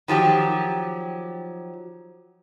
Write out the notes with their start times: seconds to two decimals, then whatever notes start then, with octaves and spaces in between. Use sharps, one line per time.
0.08 D#3 F3 F#3 G4